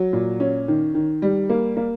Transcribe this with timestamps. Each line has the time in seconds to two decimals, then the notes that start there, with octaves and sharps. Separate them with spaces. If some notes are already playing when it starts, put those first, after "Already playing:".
Already playing: F#3
0.13 A#2
0.40 C#4
0.68 D#3
0.95 D#3
1.22 G3
1.50 A#3
1.77 A#3